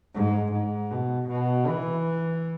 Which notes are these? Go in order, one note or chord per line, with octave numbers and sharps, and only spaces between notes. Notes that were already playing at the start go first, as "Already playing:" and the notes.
G#2
G#2
B2
B2
E3